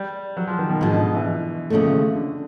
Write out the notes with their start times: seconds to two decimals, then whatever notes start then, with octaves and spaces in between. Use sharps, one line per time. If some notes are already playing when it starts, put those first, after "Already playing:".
Already playing: G3
0.37 F#3
0.47 F3
0.59 D#3
0.70 B2
0.81 G#2 B2 F3 G#3
0.92 D3
1.15 E3
1.70 D#2 C#3 F3 A3
2.15 D3